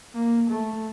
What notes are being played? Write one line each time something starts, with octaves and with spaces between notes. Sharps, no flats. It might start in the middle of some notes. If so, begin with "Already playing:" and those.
A#3
A3